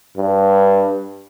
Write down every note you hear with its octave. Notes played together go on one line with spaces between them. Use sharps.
G2